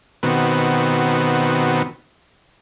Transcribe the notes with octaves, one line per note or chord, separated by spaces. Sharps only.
B2 D#3 B3 C4 F#4